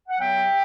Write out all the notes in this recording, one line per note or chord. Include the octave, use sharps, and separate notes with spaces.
F#5
F#3 B3 E5 G5